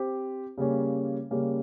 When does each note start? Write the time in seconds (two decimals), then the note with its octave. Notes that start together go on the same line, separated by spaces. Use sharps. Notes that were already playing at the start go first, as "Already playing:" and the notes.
Already playing: C4 G4 C5
0.58 C#3 G3 A#3 C#4
1.31 C#3 G3 A#3 C#4